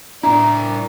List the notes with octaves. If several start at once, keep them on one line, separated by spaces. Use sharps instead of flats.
A2 D4 E4 A#4 D5 A#5